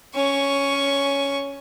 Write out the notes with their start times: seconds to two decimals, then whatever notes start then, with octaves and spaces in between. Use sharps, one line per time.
0.15 C#4 C#6